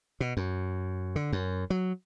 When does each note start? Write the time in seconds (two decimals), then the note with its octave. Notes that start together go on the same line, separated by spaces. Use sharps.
0.20 B2
0.37 F#2
1.16 D3
1.33 F#2
1.70 F#3